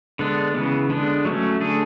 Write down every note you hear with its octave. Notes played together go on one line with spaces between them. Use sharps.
D3 G#3 B3 D4
C#3 E3 B3
D3 G#3 B3 D4
F#3 A3 C#4
D3 A3 D4 G#4